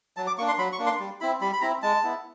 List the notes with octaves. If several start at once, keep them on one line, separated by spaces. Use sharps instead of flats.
F#3 A5
D6
A#3 D4 C#6
C6
F#3 B5
C#6
A#3 D4
C6
G3
C4 E4 B5
G3 B5
B5
C4 E4 A#5
G#3 A5
B3 E4